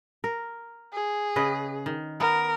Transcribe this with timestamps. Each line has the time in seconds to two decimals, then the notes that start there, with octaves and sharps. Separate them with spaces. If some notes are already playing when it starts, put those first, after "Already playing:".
0.24 A#4
0.93 G#4
1.36 C#3 B4 D#5
1.86 D#3
2.20 B3 A#4